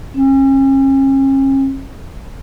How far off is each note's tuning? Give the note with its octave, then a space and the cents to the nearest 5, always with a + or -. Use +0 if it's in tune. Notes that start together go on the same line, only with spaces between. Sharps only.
C#4 -40